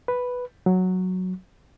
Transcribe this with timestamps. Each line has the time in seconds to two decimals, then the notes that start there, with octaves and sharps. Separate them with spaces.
0.08 B4
0.66 F#3